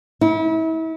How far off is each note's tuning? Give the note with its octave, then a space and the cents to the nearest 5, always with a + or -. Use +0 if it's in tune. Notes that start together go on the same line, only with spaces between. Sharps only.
E4 -35